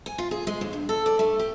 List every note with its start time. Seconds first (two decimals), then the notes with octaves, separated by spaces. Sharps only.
0.06 G#5
0.18 F4
0.31 G#4
0.47 G#3
0.61 D#2
0.73 G2
0.89 A4
1.06 D5
1.19 A3
1.39 G4